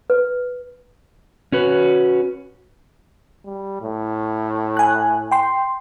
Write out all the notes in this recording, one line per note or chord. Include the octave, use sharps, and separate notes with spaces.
B4
C#4 F#4 B4
G3
A2
G#5 F#6
G5 C6